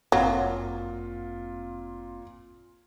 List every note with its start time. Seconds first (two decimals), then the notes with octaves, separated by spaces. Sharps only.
0.12 G1 F#2 A#2 F#3 C4 F4